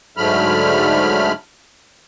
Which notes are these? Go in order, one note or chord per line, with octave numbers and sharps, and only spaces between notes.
G#2 D3 F#3 A3 B5 F6